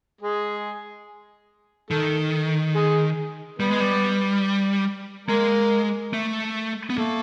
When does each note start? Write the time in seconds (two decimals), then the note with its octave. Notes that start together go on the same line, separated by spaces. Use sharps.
0.21 G#3 G#4
1.90 D#3 A3 A4
2.75 G#3 G#4
3.59 G3 B3 B4
3.69 G#3
3.80 G3
5.28 G#3 A#3 A#4
6.13 A3
6.90 B3
6.98 A3 A#3 A4